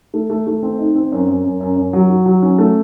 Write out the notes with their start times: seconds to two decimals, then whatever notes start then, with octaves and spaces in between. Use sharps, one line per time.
0.14 A3
0.30 A3
0.47 A3
0.63 C4
0.79 D#4
0.95 C4
1.12 F#2
1.28 F#2
1.44 F#2
1.60 F#2
1.76 F#2
1.93 F#3
2.10 F#4
2.26 F#3
2.42 C#4
2.58 A3